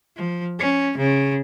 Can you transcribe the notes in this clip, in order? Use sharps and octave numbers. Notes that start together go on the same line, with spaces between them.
F3
C#4
C#3